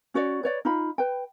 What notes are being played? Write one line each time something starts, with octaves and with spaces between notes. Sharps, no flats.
C#4 F#4 C#5 D5
B4 C#5 D5
D#4 F4 B5
B4 G5